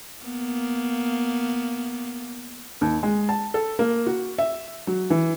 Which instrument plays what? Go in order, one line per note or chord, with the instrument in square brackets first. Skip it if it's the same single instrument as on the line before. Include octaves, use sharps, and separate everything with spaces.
[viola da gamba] A#3 B3
[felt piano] D#2
G#3
A5
A4
A#3
F#4
E5
F#3
E3